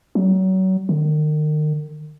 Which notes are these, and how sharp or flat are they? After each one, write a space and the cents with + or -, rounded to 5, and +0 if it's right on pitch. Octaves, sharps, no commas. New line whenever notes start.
F#3 +30
D#3 -35